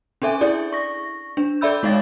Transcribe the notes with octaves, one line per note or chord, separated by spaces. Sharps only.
C#4 D4 A4 E5 G#5
E4 G#4 D5
C#6 A#6
D4
A4 D5 E5 B5 E6 G6
G#3 D#4 C#5 D#5 F5 A6